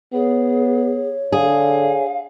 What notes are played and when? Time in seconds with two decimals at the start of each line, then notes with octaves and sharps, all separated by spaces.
0.13 B3 G#4 C#5
1.32 D3 G#4 F5